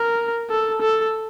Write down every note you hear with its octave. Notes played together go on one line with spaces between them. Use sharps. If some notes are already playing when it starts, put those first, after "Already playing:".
Already playing: A#4
A4
A4